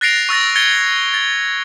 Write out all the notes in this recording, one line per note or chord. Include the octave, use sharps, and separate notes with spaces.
F#6 A6 A#6 C7 D7 F7
C#6 E6 A6 A#6
G#6 A6 C#7 G7
A6